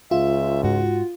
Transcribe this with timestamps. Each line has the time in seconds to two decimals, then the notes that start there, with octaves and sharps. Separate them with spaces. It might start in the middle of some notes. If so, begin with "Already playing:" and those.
0.11 C#2 F4 E5
0.64 G#2 F#4